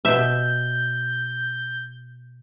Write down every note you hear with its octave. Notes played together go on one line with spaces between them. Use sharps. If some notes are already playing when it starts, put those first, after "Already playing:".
B2 E5 G6